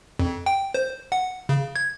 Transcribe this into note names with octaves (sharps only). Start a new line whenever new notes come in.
F2
G5
C5
F#5
C#3
G#6